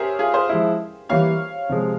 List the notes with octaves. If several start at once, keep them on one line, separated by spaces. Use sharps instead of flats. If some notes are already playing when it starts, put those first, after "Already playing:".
Already playing: G4 G#4 A#4 C5 C#5 E5
F4 G#4
G#4 C5
F3 G#3 E4
E3 G3 A#3 C#5 F5
C3 F3 G#3